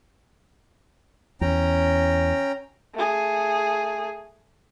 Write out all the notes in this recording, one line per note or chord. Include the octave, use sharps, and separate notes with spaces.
E2 C#4 G5 A#5
A3 G#4